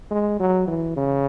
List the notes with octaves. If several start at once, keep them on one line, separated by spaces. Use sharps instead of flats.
G#3
F#3
E3
C#3